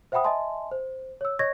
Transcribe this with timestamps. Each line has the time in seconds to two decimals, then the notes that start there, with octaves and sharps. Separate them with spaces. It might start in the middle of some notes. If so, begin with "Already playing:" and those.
0.12 C5 E5 F#5 G5 B5 D#6
0.24 D#5 E5 G#5 A5 C6
0.71 C5
1.21 C#5 E6
1.39 C#5 D#5 C#6 G#6 A#6